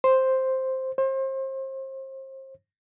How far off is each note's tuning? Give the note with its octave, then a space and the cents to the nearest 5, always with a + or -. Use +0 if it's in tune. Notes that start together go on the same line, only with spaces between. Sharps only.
C5 +0
C5 +30